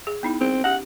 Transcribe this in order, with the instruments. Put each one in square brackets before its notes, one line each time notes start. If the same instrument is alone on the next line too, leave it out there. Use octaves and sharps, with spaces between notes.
[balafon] G#4
B3 D#4 E4
[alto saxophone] C4 [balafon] G#4
[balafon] C#4 G4 [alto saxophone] F#5